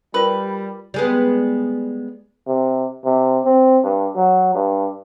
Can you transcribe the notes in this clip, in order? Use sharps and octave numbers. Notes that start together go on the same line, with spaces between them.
G3 F4 A#4 B4
G3 G#3 B3
C3
C3
C4
G2
F#3
G2